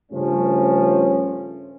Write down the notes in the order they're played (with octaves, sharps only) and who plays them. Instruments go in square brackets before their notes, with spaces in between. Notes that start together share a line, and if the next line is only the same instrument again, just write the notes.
[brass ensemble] G2 C#3 F3 A3 C#4